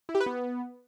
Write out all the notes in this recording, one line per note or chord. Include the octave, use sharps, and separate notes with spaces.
E4
G4
B4
B3